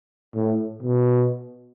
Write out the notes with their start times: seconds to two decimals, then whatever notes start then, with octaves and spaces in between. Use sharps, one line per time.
0.35 A2
0.83 B2